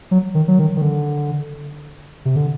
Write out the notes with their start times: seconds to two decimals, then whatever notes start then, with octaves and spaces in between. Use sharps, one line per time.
0.11 F#3
0.35 D#3
0.48 F#3
0.59 D#3
0.76 D#3
0.82 D3
2.25 C3
2.36 D3